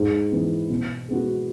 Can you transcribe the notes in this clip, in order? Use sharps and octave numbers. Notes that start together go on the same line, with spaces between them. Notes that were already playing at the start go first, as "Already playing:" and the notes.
Already playing: G#2
E3 B3
B2
G#3 B3 F#4